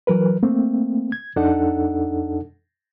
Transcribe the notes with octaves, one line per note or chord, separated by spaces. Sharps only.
E3 F#3 A#4 B4
A3 A#3 C4
G#6
F2 D4 D#4 A4 F#5